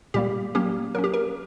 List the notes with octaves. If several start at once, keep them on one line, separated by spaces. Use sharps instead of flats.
A#2 G3 A#3 G4
F#3 A#3 C#4 G4
F#3 A#3 C#4 A#4
G4
A#4